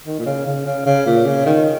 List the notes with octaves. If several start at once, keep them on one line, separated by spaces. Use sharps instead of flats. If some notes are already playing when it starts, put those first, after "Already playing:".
D#3
A#2
C#3
C#3
C#3
C#3
A#2
C#3
D#3